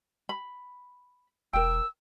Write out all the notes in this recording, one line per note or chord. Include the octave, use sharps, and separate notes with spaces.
B5
E1 A#4 G5 E6